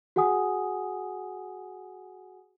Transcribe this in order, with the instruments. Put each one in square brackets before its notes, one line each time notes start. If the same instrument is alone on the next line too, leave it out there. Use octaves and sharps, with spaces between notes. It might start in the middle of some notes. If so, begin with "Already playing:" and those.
[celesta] F#4 G#4 F#5 G#5 D#6